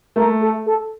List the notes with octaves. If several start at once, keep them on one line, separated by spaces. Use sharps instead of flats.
A3 A#4
A4
A4